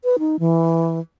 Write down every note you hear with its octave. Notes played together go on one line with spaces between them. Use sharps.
B4
D#4
E3